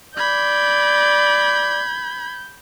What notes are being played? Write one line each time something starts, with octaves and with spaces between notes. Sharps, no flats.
D5 B5 G6 G#6